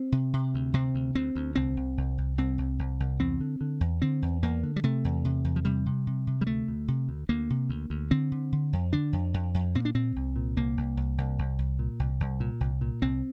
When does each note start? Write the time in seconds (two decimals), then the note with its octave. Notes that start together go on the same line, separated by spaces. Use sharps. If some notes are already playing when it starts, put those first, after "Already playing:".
Already playing: C4
0.12 C3
0.33 C3
0.54 D2
0.74 C3 C4
0.95 D2
1.15 D2 C4
1.35 D2
1.55 C2 C4
1.77 C2
1.97 C2
2.18 C2
2.38 C2 C4
2.58 C2
2.79 C2
3.00 C2
3.19 E2 C4
3.41 D3
3.61 D3
3.81 E2
4.02 D3 C4
4.22 E2
4.43 E2 A#3
4.63 D3
4.76 G3
4.84 C3 A3
5.05 E2
5.25 C3
5.44 E2
5.56 F3
5.65 C3 G3
5.86 C3
6.07 C3
6.27 C3
6.41 G3
6.47 D2 A3
6.68 D2
6.88 C3
7.09 D2
7.29 D2 A#3
7.50 C3
7.69 D2
7.90 D2
8.11 D3 C4
8.32 D3
8.52 D3
8.73 F2
8.93 D3 D4
9.13 F2
9.34 F2
9.54 F2
9.75 A#2 C4
9.85 D4
9.94 A#2 C4
10.16 C2
10.36 A#2
10.56 C2 A#3
10.77 C2
10.97 C2
11.18 C2
11.39 C2
11.58 C2
11.79 A#2
12.00 C2
12.20 C2
12.40 A#2
12.61 C2
12.81 A#2
13.02 C2 C4